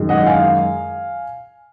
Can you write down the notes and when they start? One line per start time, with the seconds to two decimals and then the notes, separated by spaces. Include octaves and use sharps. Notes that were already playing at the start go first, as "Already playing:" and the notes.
Already playing: F#2 D#3 G#3
0.09 D#5 F#5
0.26 F5 G#5